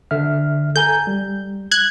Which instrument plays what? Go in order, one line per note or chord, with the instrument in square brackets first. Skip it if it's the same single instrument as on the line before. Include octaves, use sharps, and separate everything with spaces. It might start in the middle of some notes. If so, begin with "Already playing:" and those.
[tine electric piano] D3 E5 F6
[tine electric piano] A4 G#5 A#5 [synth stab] G6
[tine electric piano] G3
[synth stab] F#6 G#6